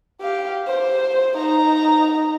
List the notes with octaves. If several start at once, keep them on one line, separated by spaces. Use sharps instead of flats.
G4 F5
C5
D#4 A#5